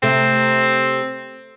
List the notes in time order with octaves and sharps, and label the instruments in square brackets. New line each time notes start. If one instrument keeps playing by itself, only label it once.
[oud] C3 A3 [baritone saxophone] C4